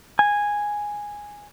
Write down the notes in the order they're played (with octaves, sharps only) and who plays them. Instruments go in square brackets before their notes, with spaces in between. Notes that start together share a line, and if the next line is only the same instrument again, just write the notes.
[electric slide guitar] G#5